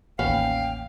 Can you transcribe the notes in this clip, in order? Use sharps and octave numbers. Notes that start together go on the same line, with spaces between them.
A1 D#2 B3 C#4 F5 G5